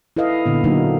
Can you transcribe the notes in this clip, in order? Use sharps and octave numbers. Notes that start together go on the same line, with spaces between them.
E4 A4 B4 D#5 F5
A#2 D3 B3
D3 F#3 A#3 D#4